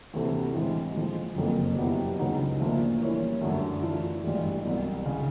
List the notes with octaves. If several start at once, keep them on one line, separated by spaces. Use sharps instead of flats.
D2 C3 E3 A3
A1 A2 E3 G#3 C4
A2 F3 G#3
F#1 F2 C#3 F#3 A#3
B2 F#3 B3 E4 G4
C#2 C#3 F#3 B3 D#4
A#2 F3 A3 D4
E3 G3 A#3 C#4 E4
F#2 D3 F#3 A3
E3 A3 D4 F4
A1 G2 E3 G#3
C2 B2 F#3
C#3